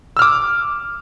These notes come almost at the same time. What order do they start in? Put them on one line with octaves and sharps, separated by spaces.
E6 F6 D6